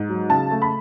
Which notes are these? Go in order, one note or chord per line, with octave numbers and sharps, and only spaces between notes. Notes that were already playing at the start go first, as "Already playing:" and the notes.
Already playing: G#2
F#3
C#3 A5
A3
B5